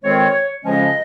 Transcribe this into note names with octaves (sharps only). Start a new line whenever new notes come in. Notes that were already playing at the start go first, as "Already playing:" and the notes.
F2 D#3 G#3 C4 C#5
F2 C#3 F3 G#3 C#4 D#5